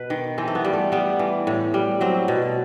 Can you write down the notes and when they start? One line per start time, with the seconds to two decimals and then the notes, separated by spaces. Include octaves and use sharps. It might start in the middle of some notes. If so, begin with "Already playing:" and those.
Already playing: B2 B4
0.10 D#3
0.38 E3 C4
0.48 A3
0.55 B3
0.65 G3
0.73 A3
0.92 G3 B3
1.19 E3
1.47 A2
1.74 G3
2.01 F#3 C4
2.28 B2